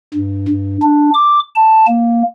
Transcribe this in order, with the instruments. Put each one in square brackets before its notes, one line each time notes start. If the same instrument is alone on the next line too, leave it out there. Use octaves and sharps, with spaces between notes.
[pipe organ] G2
G2
D4
D6
A5
A#3